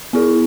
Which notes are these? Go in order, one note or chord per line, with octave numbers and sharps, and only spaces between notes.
B3 E4 G#4